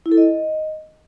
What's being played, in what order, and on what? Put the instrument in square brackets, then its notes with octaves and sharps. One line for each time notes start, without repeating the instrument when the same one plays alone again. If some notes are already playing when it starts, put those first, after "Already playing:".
[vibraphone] E4
A4
D#5